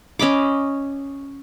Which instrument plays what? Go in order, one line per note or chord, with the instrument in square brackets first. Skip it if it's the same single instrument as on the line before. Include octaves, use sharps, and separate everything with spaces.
[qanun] C#4 D#5 B5 D6